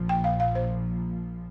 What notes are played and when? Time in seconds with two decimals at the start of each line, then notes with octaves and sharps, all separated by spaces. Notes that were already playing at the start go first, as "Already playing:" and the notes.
Already playing: A#1 A#2 F3
0.09 G5
0.24 F5
0.40 F5
0.55 C5